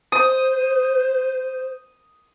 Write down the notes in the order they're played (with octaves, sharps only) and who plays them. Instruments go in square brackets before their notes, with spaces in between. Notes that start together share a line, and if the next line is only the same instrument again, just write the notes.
[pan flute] C5 [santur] D#6